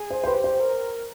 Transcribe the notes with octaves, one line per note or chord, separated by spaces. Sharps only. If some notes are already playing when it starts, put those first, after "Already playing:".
Already playing: G#4
C5
C5
G4 B4
C5
A#4